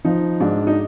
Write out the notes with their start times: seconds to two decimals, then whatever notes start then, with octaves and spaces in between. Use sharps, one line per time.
0.05 F3 D#4
0.40 G#2 D4
0.67 D#4